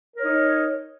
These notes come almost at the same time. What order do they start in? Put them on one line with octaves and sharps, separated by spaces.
A#4 C#5 D#4